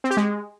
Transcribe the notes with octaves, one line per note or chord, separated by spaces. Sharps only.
C4
G4
G#3